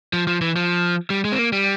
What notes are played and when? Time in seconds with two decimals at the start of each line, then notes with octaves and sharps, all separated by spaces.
0.13 F3
0.27 F3
0.41 E3
0.56 F3
1.10 G3
1.25 G#3
1.32 C4
1.39 A#3
1.53 G3